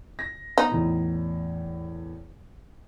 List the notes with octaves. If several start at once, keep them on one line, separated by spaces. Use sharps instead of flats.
A#6
B3 D#4
E2 A2